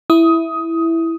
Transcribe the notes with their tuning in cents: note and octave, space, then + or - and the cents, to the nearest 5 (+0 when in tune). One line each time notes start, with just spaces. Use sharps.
E4 +0 D#6 +15